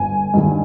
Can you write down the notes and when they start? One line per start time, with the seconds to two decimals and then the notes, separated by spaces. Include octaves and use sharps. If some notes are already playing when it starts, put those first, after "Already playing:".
Already playing: G1 G#5
0.34 G2 D#3